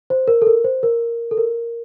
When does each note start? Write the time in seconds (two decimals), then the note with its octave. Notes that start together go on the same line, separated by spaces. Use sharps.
0.10 C5
0.28 A#4
0.42 A4
0.47 A#4
0.64 C5
0.83 A#4
1.31 A4
1.37 A#4